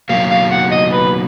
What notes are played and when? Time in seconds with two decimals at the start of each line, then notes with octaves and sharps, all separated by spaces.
0.09 B2 F#3 A#3 F5
0.30 F5
0.52 F#5
0.71 D#5
0.92 B4